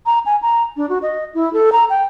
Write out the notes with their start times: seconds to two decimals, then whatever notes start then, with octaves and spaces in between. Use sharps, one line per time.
0.06 A#5
0.26 G#5
0.42 A#5
0.77 D4
0.89 F#4
1.02 D#5
1.35 E4
1.53 A4
1.72 A#5
1.90 G5